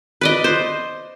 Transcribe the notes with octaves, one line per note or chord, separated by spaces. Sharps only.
B4 D5 D#5
C5